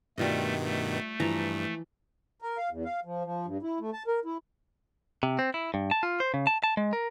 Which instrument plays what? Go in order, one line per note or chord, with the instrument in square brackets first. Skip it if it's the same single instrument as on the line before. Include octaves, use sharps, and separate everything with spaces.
[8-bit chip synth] G2 B2 D#3 [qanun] G3 F4 D#5 [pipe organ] A3
[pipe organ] A3
[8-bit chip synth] G2 [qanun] E3 F3 A#5
[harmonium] A#4
F5
E2
F5
F3
F3
G2
E4
A3
A5
A#4
E4
[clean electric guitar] C3
C4
E4
G2
A5
F4
C5
C#3
A5
A5
G#3
A#4